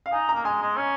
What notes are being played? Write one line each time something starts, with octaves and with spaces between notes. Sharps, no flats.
F5
D#4 G#5
A#5
A#3
G#3 G#5
G#3
C#4